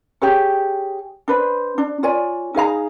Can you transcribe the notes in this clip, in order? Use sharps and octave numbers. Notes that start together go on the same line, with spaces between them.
G4 G#4 C#5
D4 B4 C5
D4
F4 C#5 D5 G#5
D#4 G#4 F5 A#5